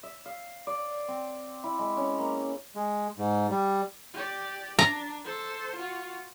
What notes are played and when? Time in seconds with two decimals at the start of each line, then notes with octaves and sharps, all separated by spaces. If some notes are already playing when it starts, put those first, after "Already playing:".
0.03 E5
0.26 F5
0.67 D5
1.08 C4
1.64 E4
1.79 G#3
1.97 C#4
2.18 A#3
2.75 G#3
3.18 G#2
3.51 G3
4.14 G4 D5
4.79 D4 A#5
5.24 A4 C5
5.75 F4 F#4